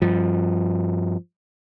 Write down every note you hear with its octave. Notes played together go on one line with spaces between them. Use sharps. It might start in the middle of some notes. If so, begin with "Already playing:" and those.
G2 F3